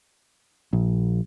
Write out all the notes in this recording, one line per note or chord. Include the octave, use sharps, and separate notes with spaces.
A#1